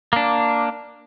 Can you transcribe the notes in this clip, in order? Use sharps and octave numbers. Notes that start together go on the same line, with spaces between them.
A#3 D4